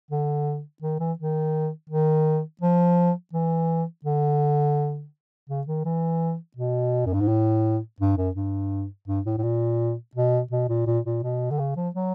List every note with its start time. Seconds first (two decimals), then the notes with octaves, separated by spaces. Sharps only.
0.11 D3
0.82 D#3
1.00 E3
1.19 D#3
1.90 D#3
2.61 F3
3.33 E3
4.05 D3
5.49 C#3
5.67 D#3
5.85 E3
6.57 B2
7.06 F#2
7.13 G2
7.21 G#2
7.28 A2
8.00 G2
8.17 F#2
8.35 G2
9.08 G2
9.26 A2
9.38 A2
9.43 A#2
10.15 B2
10.51 B2
10.69 A#2
10.87 A#2
11.06 A#2
11.23 B2
11.51 D3
11.59 C#3
11.76 F3
11.95 F#3